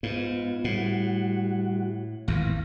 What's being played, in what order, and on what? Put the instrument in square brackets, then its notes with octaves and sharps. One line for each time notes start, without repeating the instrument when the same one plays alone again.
[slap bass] G#2 [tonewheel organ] B3 F4
[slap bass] A2 [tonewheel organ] G3 F#4
[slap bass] G#1 E2 [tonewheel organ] A2 F5 A#6